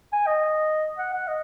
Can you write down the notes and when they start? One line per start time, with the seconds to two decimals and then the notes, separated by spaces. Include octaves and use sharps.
0.13 G#5
0.27 D#5
0.99 F#5
1.13 F#5
1.28 D#5